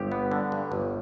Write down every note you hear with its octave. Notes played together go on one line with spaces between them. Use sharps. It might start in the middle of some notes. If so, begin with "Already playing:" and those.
Already playing: G1 G4
B3
D3
G2
G1